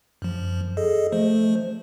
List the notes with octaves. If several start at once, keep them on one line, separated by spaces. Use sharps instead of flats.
F#2 F3
G#4 A4 D#5
F3 A3 C5